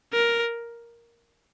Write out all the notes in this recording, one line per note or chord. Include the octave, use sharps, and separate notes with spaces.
A#4